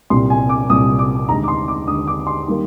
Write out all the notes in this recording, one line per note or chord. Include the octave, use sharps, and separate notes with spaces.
C2 A#2 G3 C6
G#5
D6
C2 A#2 G3 D#6
D6
D#2 D3 G#3 A#5
D6
C6
D6
D#2 D3 G#3 D#6
D6
C6
D#3 G3 A#3